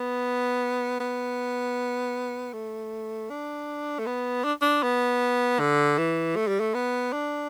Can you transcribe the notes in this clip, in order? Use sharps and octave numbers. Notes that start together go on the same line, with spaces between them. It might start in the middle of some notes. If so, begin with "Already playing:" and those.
Already playing: B3
B3
A3
D4
A3
B3
D4
D4
B3
D3
E3
A3
G3
A3
B3
D4